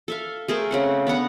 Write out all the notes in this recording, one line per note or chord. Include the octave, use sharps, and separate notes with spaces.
A4 E5 F5
A3 G#4 A#4 C5
C#3 C4 F#5
B3 D4 F#5 A#5